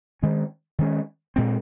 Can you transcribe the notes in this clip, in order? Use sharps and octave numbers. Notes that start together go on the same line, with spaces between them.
D#3 G#3 C#4
D#3 G#3 C#4
A#2 G#3 C4